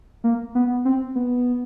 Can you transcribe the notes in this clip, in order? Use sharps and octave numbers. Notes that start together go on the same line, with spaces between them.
A#3
B3
C4
B3